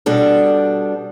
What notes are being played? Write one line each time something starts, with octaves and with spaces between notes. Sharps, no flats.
B2 G3 D4 A4